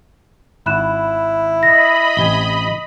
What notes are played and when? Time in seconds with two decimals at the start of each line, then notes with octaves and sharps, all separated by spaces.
0.66 G#1 E4 B5 F#6 E7
1.63 D#5 B5 A#6
2.17 A1 C3 G#5 G7